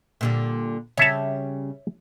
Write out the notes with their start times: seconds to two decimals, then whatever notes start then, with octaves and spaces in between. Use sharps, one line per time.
0.21 A#2 D3 G3
0.97 C#3 G3 C#5 E5 A5